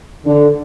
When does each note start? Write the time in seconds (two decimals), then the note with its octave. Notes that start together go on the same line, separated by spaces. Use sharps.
0.25 D3